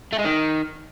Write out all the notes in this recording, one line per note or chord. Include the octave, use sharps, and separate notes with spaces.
A3
G#3
D#3